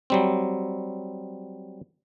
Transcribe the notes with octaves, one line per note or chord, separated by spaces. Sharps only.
F#3 G3 C4